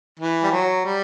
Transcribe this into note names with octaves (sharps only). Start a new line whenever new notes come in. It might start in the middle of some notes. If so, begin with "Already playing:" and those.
E3
G3
F#3
G3